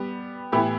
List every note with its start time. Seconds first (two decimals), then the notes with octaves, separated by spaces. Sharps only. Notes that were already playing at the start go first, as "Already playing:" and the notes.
Already playing: G3 B3 G4
0.52 A2 E3 B3 E4 G4